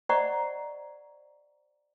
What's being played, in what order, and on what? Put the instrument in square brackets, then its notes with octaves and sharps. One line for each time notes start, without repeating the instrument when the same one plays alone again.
[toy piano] C5 D5 D#5 F#5 A#5 C#6